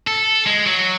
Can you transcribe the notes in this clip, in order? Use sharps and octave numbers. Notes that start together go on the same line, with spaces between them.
A4
G#3
F#3